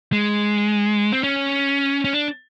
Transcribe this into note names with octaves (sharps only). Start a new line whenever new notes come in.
G#3
C4
C#4
C#4
D4